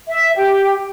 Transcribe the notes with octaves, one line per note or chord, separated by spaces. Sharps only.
E5
G4